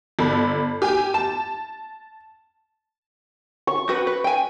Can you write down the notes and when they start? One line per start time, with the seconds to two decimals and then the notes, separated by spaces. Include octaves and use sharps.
0.19 G1 A4 B5
0.82 G4 G#5
1.14 A5
3.67 C#6
3.88 C4 F#4 B4
4.07 B4
4.24 G5 G#5